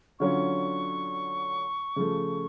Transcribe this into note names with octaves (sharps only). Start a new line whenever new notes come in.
D3 F#3 C#4 F4 C#6
C#3 F3 A3